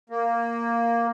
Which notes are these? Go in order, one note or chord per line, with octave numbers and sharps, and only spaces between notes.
A#3